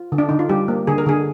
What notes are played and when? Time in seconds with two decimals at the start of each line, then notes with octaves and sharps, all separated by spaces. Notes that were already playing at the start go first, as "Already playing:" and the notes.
Already playing: F4
0.12 D3
0.18 D4
0.29 D3 D#4
0.39 F4
0.49 G3 G4
0.68 A#3
0.87 D3 G#4
0.98 A#4
1.06 D3 G#4